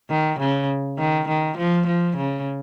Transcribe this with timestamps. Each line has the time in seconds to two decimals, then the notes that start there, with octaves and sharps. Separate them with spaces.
0.10 D#3
0.39 C#3
0.98 D#3
1.29 D#3
1.58 F3
1.87 F3
2.17 C#3